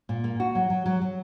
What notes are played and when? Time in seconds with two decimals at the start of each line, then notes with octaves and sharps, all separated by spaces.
0.09 A#2
0.24 A#3
0.40 F#4
0.55 F#3
0.70 F#3
0.86 F#3
1.01 F#3